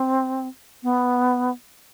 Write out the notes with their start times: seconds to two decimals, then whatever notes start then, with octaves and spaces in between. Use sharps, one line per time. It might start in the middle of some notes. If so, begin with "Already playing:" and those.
Already playing: C4
0.83 B3